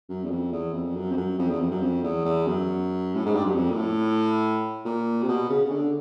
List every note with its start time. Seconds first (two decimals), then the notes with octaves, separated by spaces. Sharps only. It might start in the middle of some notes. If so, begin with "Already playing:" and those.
0.09 F#2
0.25 E2
0.30 F2
0.52 E2
0.74 F2
0.95 F#2
1.11 F2
1.17 F#2
1.39 F2
1.49 E2
1.60 F2
1.71 F#2
1.82 F2
2.03 E2
2.25 E2
2.47 F#2
3.15 A2
3.25 G#2
3.35 G2
3.45 F#2
3.55 F2
3.70 A#2
3.76 A2
4.85 A#2
5.23 C3
5.28 B2
5.50 C#3
5.65 C#3
5.71 D3